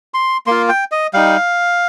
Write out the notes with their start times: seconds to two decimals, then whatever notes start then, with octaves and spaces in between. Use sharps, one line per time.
0.14 C6
0.47 A#3 F4 C6
0.69 G5
0.92 D#5
1.14 G3 D#4 F5